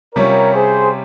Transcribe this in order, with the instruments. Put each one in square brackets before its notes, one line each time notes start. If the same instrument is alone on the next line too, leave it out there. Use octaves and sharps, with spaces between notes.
[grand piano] C3 G3 C#4 F4 [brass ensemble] A#4 C#5
[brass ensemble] G#4 C5